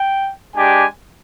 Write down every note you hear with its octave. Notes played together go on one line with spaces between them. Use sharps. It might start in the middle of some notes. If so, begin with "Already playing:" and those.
Already playing: G5
G#3 D4 G4 G#5